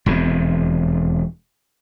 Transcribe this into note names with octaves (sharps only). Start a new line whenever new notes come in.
E1 F2 C3